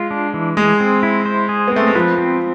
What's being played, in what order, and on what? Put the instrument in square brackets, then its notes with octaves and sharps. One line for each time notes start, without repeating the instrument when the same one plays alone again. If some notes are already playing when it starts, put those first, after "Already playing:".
Already playing: [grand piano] G#3 [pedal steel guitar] F4
[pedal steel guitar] D4
E3
[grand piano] G#3 [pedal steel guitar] G#4
[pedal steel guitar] C4
E4
C5
G#4
[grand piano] B3
[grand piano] A3 [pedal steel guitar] C4
[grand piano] G#3
[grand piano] F3 [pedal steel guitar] B4
[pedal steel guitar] C4